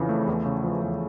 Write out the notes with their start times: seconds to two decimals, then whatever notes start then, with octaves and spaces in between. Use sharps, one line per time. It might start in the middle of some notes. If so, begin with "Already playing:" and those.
Already playing: F2 C#3 E3
0.09 A3
0.28 E2
0.46 C#3
0.64 F3
0.82 E2